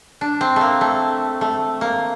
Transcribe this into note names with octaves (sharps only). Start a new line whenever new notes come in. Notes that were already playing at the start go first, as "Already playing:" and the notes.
D4
C4
A3 A#3
A3
A3
A#3